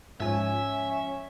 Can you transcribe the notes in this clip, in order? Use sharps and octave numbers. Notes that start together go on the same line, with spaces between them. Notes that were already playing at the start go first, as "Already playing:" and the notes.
G#2 F3 C#4 E5 G#5